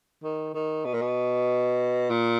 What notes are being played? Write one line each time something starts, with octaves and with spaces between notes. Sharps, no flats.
D#3
D#3
B2
A#2
B2
A#2